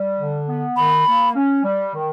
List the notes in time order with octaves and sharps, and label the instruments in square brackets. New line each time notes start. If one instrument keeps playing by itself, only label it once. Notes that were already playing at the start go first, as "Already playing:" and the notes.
Already playing: [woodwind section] G3
D3
B3
[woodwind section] D#3 [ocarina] B5
[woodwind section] A#3
C#4
G3
D#3